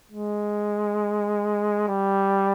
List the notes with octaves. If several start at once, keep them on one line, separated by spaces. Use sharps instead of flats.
G#3
G3